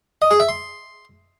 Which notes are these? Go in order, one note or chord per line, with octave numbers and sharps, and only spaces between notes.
D#5
G#4
E5
C6